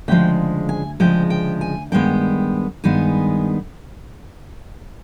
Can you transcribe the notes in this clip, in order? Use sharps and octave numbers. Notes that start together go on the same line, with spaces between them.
D2 C#3 F3 G#3 G5
G#5
D2 C#3 F3 G#3 G5
G5
G#5
G2 D#3 G#3 B3 G5
G2 D#3 G#3 B3 G#5